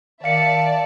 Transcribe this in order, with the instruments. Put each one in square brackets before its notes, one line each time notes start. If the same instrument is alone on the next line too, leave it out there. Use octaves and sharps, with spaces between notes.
[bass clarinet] D#3 [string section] D5 E5 A5 [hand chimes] F5 C#7